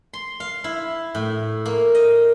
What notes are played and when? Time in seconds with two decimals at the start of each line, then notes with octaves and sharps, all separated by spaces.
0.13 C6
0.40 F5
0.64 E4
1.15 A2
1.65 A#3
1.95 D#5